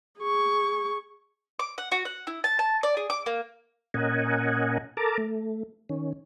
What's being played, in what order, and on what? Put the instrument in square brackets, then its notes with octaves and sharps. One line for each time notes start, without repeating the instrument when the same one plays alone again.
[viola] G#4 C#6
[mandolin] D6
F#5
F#4
F#5
E4
A5
A5
D5
G#4
D6
A#3
[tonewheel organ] A#2 C#4 A#4 D#5 F#5 G#5
A4 A#4 A5 A#5 D6
A3
D#3 C#4